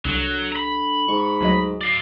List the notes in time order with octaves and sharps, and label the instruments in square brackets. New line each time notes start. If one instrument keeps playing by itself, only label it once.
[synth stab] C2 [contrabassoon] D3 [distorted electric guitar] F#3
[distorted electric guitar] A#5 B5
[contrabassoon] G#2 [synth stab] C#6
[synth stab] D2 F#3 D#5
[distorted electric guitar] D5 F5